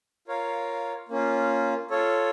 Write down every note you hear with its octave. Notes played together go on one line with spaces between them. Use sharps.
F4 A#4 C#5 F5
A#3 C#4 F4
F4 A4 C#5